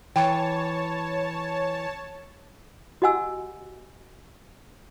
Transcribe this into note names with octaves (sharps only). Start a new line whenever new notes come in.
E3 C#5 G5 A5
F#4 G4 D#5 F#5 G#5 E6